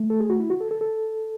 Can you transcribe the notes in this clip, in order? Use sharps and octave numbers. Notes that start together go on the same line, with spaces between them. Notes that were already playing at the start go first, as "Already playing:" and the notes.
Already playing: A3
A4
G#4
F#4
E4
F#4
A4
A4
A4